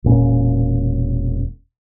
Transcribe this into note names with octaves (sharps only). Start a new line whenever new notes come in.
E1 A#2 C#4